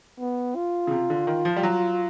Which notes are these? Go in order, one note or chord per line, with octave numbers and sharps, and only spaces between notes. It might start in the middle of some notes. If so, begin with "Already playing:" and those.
B3
F4
C#3
C3
D3
D#3
F3
G3
F#3